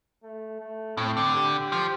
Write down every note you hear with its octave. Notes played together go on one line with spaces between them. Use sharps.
A3
A3
A2 C4
D3
G4
F3